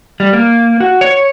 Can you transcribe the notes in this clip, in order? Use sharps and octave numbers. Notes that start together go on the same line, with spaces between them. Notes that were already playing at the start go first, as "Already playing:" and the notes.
G3
A#3
F#4
C#5